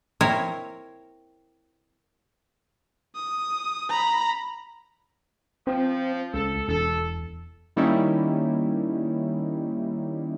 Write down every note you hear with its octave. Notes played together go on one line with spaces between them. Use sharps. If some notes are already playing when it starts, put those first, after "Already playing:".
C4 E4 A#4 C#5 E5
D#6
A#5 B5
F3 C4
C#2 A4
E1 A4
D#3 G3 A#3 C#4 D#4 E4